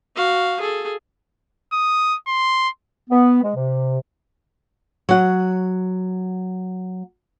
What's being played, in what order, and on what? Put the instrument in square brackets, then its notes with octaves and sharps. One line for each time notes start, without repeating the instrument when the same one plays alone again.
[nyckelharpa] F#4 F5
G#4 A4
[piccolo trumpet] D#6
C6
[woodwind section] B3
G#3
C3
[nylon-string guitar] F#3 F#5